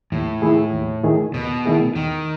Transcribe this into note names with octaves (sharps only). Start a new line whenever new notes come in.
D#2 A2
D#3 A3 E4 G#4
D#2
D#3 A3 E4 G#4
D#2 B2
D#3 A3 E4 G#4
D#2 D#3